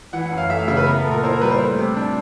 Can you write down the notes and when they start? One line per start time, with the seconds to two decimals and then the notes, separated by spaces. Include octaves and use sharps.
0.13 E3 F#5
0.25 F#5
0.32 F#2
0.38 F5
0.50 A3 E5
0.59 F5
0.68 C#3 E5
0.77 B4
0.86 B3 A#4
0.99 A4
1.05 A#2
1.11 A#4
1.23 E4 C5
1.32 A#4
1.41 G3 B4
1.51 C5
1.60 A3
1.78 C3
1.96 D4